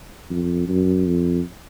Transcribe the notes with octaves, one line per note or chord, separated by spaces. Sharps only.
F2
F#2
F2